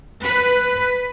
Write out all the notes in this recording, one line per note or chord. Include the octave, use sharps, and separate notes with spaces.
B4